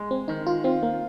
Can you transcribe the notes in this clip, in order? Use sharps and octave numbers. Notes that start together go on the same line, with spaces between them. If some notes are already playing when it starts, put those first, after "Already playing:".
Already playing: G#3
C4
D#3 D#4
F4
C4 F4
A#3